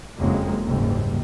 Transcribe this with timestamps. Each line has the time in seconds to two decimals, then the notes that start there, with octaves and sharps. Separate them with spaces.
0.17 F#1 F2 F#3 G#3 A#3
0.64 F#1 D#2 G#2 G3